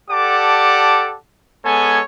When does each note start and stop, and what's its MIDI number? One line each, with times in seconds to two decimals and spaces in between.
0.11 1.16 67
0.11 1.16 69
0.11 1.16 74
0.11 1.16 78
0.11 1.16 81
0.11 1.16 86
1.66 2.01 56
1.66 2.01 59
1.66 2.01 69
1.66 2.01 73
1.66 2.01 80